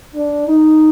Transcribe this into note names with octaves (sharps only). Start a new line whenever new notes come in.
D4
D#4